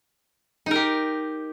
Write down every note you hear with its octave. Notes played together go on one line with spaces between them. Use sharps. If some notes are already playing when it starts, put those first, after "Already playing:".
D#4 G4 A#4